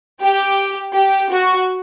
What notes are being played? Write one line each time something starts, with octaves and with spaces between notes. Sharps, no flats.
G4
G4
F#4